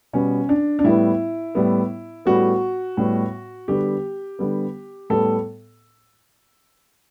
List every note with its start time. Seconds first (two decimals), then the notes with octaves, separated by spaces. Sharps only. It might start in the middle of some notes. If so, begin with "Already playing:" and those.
0.13 B2 G3 B3 C#4
0.49 D4
0.79 D4
0.84 A2 G3 B3 E4
1.55 A2 G3 B3
2.25 A2 G3 B3 F#4
2.97 A2 G3 B3
3.68 D3 G3 B3 G4
4.39 D3 G3 B3
5.10 A2 G3 B3 A4